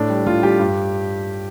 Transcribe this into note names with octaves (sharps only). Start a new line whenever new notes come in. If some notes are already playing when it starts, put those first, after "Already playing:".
Already playing: A2 D4
G3
A2 F4
G3 G4
G2